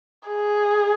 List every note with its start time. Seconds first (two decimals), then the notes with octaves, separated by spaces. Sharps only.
0.28 G#4